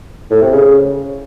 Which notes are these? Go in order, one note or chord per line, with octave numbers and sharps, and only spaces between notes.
A2
C3
C#3